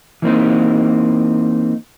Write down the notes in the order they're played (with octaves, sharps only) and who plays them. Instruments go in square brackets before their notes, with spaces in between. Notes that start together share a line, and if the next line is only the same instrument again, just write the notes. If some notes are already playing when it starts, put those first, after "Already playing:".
[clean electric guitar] E3 A#3 C4 D#4